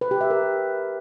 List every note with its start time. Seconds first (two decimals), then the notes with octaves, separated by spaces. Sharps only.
0.01 B4
0.11 G4
0.21 E5
0.30 A#4